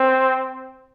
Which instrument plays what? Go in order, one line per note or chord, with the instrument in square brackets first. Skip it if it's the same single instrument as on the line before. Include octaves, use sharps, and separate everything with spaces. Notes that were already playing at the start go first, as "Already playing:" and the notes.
Already playing: [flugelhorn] C4